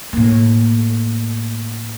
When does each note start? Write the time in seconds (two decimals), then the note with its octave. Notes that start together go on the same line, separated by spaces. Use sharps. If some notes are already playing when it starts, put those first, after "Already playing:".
0.13 A2 A#3